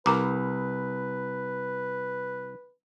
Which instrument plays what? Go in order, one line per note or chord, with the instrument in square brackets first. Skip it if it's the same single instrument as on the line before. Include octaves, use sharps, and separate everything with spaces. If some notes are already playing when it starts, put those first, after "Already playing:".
[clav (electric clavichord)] C2 [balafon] A#4 A#5 D6 [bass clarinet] B4